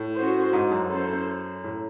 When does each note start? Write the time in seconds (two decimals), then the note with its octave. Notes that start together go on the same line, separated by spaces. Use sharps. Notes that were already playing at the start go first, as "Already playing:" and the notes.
Already playing: A2
0.17 C#4 F#4 C5
0.53 G#2
0.72 F#2
0.90 C#4 E4 A4 C5
1.64 A2